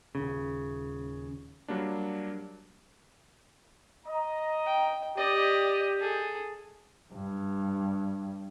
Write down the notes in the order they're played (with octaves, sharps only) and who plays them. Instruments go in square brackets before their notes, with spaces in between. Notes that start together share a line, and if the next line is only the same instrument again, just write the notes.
[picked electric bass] D#1 G#1 C#3
[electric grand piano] F#3 G3 A#3 D4
[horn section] D#5 A#5
[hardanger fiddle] G5
[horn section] G4 [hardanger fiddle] D5 D#5
[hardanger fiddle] G#4 A4
[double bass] G2